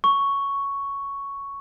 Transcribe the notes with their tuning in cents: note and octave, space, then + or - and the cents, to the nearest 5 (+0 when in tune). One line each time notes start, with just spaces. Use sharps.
C#6 +5